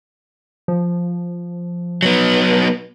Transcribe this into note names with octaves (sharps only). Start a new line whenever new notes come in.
F3
F#3 B3